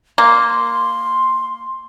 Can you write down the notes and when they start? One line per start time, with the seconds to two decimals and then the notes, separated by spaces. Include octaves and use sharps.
0.18 A#3 C6